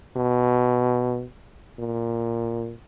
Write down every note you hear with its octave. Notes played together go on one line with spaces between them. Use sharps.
B2
A#2